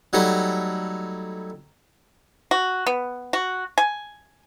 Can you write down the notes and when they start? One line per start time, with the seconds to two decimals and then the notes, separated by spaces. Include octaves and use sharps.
0.13 F#3 G3 A3 D#4 E4
2.51 F#4
2.87 B3
3.33 F#4
3.78 G#5